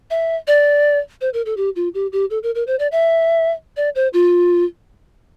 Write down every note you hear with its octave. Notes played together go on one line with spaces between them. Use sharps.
E5
D5
C5
A#4
A4
G4
F4
G4
G4
A4
A#4
A#4
C5
D5
E5
D5
C5
F4